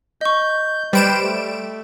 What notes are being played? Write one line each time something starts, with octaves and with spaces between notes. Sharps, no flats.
D#5 C#6 G6
G3 B4 C5 D7 E7
A3